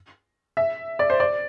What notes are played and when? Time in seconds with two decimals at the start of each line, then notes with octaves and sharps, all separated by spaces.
0.57 E5
0.99 D5
1.10 C5
1.20 D5